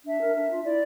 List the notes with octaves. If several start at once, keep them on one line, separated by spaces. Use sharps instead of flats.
D4 E5
A#4
D4
F4
E4 D5